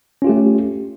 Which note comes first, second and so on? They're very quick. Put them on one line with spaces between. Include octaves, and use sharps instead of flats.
C#4 F4 G4 A3